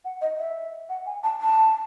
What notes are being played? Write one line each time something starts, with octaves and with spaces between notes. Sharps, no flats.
F#5
D#5
E5
F#5
G#5
A5
A5